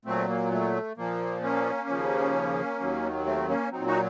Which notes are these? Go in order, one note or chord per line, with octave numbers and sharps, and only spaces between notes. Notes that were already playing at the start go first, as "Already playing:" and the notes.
A#2 F#3 A3 C4
A#3
A3
A#2 F3 A#3
A#3 C#4
D#2 C#3 F3
D#2 D#3 F#3
A3 C4
A#3 C#4
A#2 F#3 C4 D#4
D#4 F#4